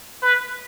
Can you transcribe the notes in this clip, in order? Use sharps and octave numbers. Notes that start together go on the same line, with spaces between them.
B4